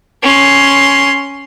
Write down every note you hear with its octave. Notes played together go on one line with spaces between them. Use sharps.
C#4 C6